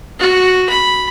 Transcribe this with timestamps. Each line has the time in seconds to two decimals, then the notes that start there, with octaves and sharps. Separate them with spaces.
0.19 F#4
0.69 B5